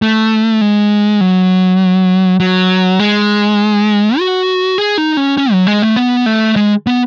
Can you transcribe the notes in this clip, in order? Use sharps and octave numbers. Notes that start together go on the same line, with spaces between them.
A3
G#3
F#3
F#3
G#3
F#4
G#4
D#4
C#4
C#4
F#3
G#3
A3
B3
A3
G#3
B3